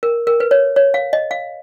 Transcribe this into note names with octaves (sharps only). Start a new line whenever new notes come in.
A#4
A#4
B4
C#5
C#5
F5
D#5
F5